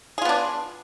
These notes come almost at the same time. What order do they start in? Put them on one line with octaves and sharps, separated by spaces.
G#4 F4 B3 D4